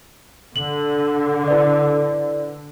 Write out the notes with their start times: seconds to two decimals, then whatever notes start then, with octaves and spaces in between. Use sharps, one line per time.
0.56 D3 F#7
1.48 E4 B4 D5